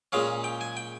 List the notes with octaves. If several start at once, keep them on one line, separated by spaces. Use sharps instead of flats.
A#2 G#3 C#4 F5
G5
G#5
G5